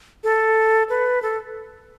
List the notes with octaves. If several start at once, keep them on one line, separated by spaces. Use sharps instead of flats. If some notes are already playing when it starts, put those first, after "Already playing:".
A4
B4
A4